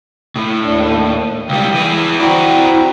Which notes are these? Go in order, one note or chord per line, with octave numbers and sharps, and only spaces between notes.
A2
D#2 D4
C#2 G3 G5
E3 G#4
C4 E4 F#4 D5 A#5